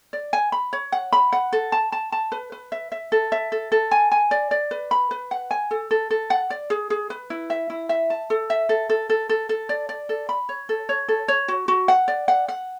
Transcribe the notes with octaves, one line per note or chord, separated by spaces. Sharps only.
D5
G#5
B5
C#5
F#5
B5
F#5
A4
A5
A5
A5
B4
B4
E5
E5
A4
E5
A4
A4
G#5
G#5
D5
D5
B4
B5
B4
F#5
G#5
A4
A4
A4
F#5
D5
G#4
G#4
B4
E4
E5
E4
E5
A5
A4
E5
A4
A4
A4
A4
A4
D5
D5
A4
B5
C#5
A4
C#5
A4
C#5
F#4
F#4
F#5
D5
F#5
F#5